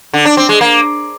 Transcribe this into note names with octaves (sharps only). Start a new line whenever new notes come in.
D3
D4
C4
G#3
A#3